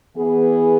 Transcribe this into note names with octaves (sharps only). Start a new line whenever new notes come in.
E3 B3 G#4